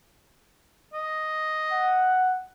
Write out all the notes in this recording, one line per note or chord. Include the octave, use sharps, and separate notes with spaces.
D#5
F#5